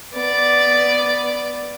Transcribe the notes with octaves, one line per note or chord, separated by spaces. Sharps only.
B3 D5